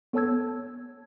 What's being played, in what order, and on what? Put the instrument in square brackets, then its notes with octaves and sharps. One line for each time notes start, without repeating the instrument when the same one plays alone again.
[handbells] B3 A4 C#5 A5 E6 G#6